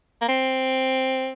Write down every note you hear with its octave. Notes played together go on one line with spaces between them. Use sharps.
A#3
C4